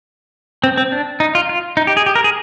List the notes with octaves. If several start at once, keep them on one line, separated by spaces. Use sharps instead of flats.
C4
C4
D4
D#4
F4
F4
D#4
G4
G#4
G4
A#4
G#4